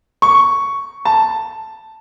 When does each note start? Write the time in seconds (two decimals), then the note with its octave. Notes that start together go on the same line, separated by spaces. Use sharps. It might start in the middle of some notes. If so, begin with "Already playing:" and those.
0.22 C#6
1.05 A5